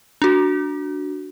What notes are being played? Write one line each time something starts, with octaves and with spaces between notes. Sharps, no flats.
D4 F#4